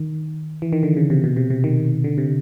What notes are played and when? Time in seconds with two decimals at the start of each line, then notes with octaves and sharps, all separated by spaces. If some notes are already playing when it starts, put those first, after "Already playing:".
Already playing: D#3
0.62 E3
0.73 D#3
0.83 D3
0.97 C#3
1.10 C3
1.24 B2
1.37 C3
1.50 C3
1.64 D#3
2.04 D3
2.18 C3